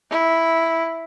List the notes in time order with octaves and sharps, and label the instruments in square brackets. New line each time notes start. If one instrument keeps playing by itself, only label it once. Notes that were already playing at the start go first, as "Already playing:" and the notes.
[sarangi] E4